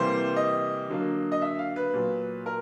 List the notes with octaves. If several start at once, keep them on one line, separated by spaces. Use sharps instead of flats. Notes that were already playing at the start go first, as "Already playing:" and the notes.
Already playing: C3 E3 G3 A#3 C5
D#5
D3 F#3 A#3
D#5
E5
F5
B4
A#2 F#3 B3
A#4